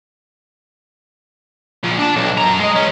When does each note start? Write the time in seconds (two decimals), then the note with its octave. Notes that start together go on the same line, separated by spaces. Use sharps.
1.83 A#2 F3
1.99 D4 A5
2.16 B1
2.38 F#2 A#5
2.60 G#3 D#5
2.76 E2 C#4